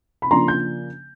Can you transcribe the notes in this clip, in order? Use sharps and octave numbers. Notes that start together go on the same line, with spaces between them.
B5
C#3 F3 A#3 D4 A#5 C6
G6